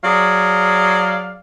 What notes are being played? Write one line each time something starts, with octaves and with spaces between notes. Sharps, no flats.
F#3 G#4 D5 F5